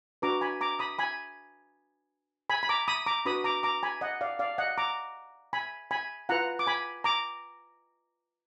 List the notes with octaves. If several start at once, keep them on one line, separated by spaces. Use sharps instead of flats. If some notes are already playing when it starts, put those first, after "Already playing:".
D4 F#4 B4 A#5 D6
G#5 B5
A#5 D6
B5 D#6
G#5 B5
G#5 B5
B5
A#5 D6
B5 D#6
A#5 D6
D4 F#4 B4 B5 D#6
A#5 D6
A#5 D6
G#5 B5
D#5 F#5
D5 F5
D5 F5
D#5 F#5
A#5 D6
G#5 B5
G#5 B5
F4 B4 F#5 A#5
D6
G#5 B5
A#5 D6